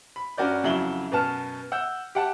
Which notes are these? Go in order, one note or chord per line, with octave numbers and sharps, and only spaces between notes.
B5
G2 C#4 F#4 A#4 D5 G6
F2 C#3 F#3 E4 F#7 G7
F#2 B2 B3 A5 F6
F#5 E6 G6
G4 F#5 A5